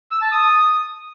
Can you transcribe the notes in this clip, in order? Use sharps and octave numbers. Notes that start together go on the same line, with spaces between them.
E6
A5
D#6